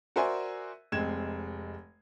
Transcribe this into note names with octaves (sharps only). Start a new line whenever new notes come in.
F#4 A#4 C5 D5 E5 G#5
F1 G#3 C4 G#6 E7